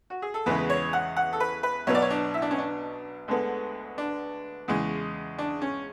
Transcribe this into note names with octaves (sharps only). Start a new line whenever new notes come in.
F#4
G#4
A4
E2 C#3 E3 G#3 B3 B4
C#5
F#5
F#5
A4
B4
B4
B1 B2 F#3 B3 C#5
D5
C#5
D4
E4
D4
C#4
D4
D2 D3 G#3 B3
D4
E2 C#3 G#3
D4
C#4